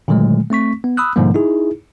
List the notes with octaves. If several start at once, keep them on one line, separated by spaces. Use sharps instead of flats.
A#2 D3 D#3 F#3 G#3 A3
A3 C4 C#6 B6
B3
B5 D#6 E6 F#6
G#2 B2 D3 F3 G3 A#3
D#4 E4 G#4